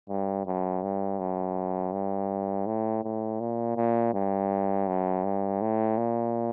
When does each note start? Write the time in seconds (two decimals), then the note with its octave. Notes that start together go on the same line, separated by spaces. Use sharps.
0.09 G2
0.46 F#2
0.83 G2
1.19 F#2
1.93 G2
2.66 A2
3.04 A2
3.40 A#2
3.77 A#2
4.14 G2
4.87 F#2
5.24 G2
5.61 A2
5.97 A#2